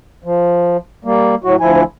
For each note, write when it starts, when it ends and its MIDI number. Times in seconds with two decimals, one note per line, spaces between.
0.24 0.77 53
1.05 1.35 55
1.05 1.35 58
1.44 1.56 45
1.44 1.56 54
1.44 1.56 66
1.60 1.83 38
1.60 1.83 53
1.60 1.83 64
1.60 1.83 80